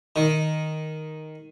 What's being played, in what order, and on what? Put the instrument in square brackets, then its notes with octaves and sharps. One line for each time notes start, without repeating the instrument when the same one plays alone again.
[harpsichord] D#3